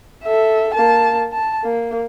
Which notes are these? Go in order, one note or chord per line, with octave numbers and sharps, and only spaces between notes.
A4 E5
A#3 A5
A5
A#3